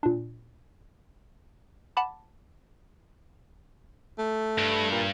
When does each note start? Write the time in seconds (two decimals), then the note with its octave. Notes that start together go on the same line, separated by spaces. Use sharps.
0.03 A#2 D4
1.97 F#5 A5 B5 D6
4.19 A3
4.58 G2
4.92 A#2